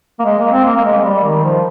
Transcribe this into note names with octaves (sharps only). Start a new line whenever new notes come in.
A#3
G#3
A#3
C4
A#3
A#3
G#3
G#3
G3
D#3
F3